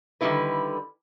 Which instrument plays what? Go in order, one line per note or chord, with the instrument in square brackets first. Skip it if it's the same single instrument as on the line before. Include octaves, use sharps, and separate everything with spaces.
[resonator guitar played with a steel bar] D3 D#3 G3 C4 E4 B4